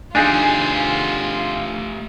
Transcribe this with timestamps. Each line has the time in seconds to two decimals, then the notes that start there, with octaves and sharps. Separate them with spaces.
0.15 A3 D4 D#4 F4 G4 G#4 G#5